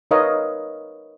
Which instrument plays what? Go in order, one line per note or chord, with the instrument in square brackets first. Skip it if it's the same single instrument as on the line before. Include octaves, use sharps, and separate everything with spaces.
[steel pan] D#4 A#4 B4 C#5 D#5 F5